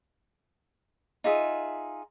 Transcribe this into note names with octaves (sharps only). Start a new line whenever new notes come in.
D#4 F4 G#4 E5